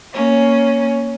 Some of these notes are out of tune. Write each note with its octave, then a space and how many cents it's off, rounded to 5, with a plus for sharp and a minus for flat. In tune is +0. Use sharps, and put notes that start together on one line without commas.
A#3 +0 C#4 +5